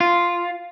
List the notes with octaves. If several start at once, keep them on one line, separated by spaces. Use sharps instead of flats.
F4